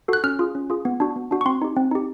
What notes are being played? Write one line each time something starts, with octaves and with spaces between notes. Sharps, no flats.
F#4 A4 F#6
C#4 F6
F4 G#4
C#4
F4 G#4
B3
D4 F#4
B3
D4 F#4
C#6
C4 C6
D#4 G4
C4
D#4 G4